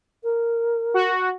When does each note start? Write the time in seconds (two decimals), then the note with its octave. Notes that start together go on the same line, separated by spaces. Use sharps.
0.23 A#4
0.94 F#4